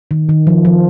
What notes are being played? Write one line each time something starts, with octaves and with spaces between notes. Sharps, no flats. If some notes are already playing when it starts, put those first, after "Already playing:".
D#3
D#3
F3
F3